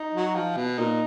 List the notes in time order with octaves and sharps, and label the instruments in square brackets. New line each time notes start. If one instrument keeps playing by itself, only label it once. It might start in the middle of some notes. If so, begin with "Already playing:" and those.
Already playing: [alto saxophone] D#4
[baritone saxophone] F#3
F3
B2
[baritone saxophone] A#2 [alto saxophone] D#4